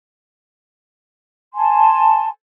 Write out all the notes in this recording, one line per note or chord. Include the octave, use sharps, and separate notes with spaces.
G#5 A5 C6